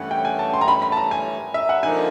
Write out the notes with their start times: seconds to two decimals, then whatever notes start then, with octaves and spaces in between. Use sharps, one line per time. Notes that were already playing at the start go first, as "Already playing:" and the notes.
Already playing: G2 E3 A3 C#4 F#5
0.11 G5
0.25 G#5
0.39 A5
0.53 C6
0.61 A#5
0.68 B5
0.82 B5
0.92 A5
0.97 A#5
1.11 G#5
1.54 E5
1.69 F#5
1.83 D3 F3 A#3 D#4 G#5